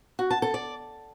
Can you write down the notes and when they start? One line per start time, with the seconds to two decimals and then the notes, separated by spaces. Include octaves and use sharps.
0.19 F#4
0.30 A5
0.42 A4
0.54 D5